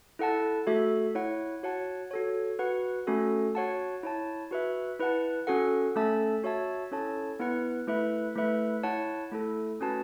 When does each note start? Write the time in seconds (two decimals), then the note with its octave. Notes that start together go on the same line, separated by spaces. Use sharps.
0.19 E4 A4 F#5 A5
0.67 A3 F#4 A4 E5
1.15 E4 C#5 F#5
1.63 F#4 C#5 F#5 A5
2.11 F#4 A4 C#5
2.59 F#4 B4 F#5
3.07 A3 C#4 F#4 A4
3.55 F#4 C#5 F#5 A5
4.03 E4 C#5 A5
4.51 F#4 B4 E5
4.99 E4 B4 F#5 A5
5.47 C#4 F#4 A4 F#5
5.96 A3 C#4 A4 E5 A5
6.43 F#4 C#5 E5 A5
6.91 C#4 E4 A4 C#5 A5
7.40 B3 E4 B4 F#5
7.87 A3 E4 B4 E5
8.36 A3 E4 B4 E5
8.83 E4 C#5 F#5 A5
9.32 A3 E4 A4
9.80 A3 C#4 F#4 B4 A5